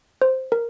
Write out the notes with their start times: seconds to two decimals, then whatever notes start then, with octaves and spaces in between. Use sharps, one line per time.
0.22 C5
0.52 A#4